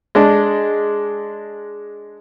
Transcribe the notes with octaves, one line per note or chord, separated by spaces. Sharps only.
G#3 D4